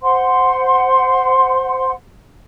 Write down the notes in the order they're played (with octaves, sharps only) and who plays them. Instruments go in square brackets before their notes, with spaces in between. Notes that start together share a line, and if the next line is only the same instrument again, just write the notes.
[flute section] C5 F#5 C6